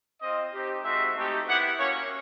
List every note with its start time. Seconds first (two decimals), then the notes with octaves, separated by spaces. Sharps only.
0.21 C4 F4 D#5
0.53 C4 D#4 G4
0.84 G#3 C4 D#4 F#4 E5
1.15 A3 C4 D#4 G4
1.47 B3 E4 G4 F#5
1.78 A#3 C#4 F#4 C#5